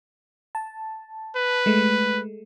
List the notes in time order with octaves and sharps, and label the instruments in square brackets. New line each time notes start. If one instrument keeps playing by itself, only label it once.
[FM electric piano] A5
[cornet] B4
[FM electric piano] G#3 A3